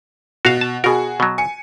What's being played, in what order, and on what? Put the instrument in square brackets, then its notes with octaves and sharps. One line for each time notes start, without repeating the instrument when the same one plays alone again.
[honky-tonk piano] B2 [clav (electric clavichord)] F#4 F5
[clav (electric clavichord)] A5
[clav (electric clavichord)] B2 A#4 [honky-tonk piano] F#4 G#4
[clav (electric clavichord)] B2 F#3
[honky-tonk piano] G#5 C#7